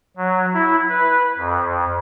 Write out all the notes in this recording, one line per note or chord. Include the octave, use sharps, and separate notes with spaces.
F#3
E4
B4
F2